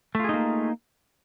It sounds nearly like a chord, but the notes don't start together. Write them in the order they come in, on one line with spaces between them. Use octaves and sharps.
A3 F4 G#4 D#4 A#3